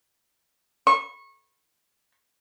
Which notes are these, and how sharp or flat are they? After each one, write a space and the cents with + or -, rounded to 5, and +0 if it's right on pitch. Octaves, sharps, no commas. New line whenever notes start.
C#6 -25